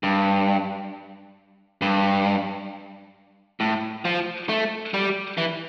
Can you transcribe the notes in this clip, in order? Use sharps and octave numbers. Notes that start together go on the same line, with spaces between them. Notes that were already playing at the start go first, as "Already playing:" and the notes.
G2
G2
A2
F3
A3
G3
E3